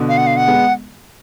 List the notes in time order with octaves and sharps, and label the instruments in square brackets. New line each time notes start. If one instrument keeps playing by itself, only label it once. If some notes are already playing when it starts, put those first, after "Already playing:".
Already playing: [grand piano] B2 D3
[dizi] F5
F#5
F5
F#5
[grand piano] G#3 B3